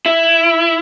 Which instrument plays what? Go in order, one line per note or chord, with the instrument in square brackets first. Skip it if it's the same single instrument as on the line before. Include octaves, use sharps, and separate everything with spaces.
[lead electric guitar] E4